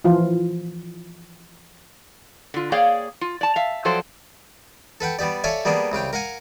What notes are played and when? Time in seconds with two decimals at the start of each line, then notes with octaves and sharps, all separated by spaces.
0.04 E3 F3 F4
2.54 D3 F4
2.72 A#3 G#4 C#5 D5 F5 G5
3.21 F4
3.41 D5 A5
3.56 E5 F5
3.85 F3 F#3 A4 C5 D5 G5
5.01 A4 B4 F#5 G5
5.19 G3 B3 G4 D5
5.44 A4 C#5 D5 E5 F5 G#5
5.65 G3 A#3 B3 D4 G#4
5.92 C2 C#3 F5 G5
6.13 A#4 F5 F#5 G#5